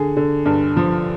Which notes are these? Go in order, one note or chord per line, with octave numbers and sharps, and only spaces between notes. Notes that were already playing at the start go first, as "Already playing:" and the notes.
Already playing: D3 G#4
D3
G2
F3